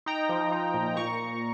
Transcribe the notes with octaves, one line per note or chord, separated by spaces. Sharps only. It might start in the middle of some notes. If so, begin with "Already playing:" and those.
D#4 G5 A#5
F3
D#4
A#2
A#2 A#5 C#6